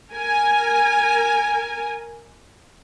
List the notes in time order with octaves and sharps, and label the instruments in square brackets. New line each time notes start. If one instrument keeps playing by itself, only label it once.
[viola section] A#4 G#5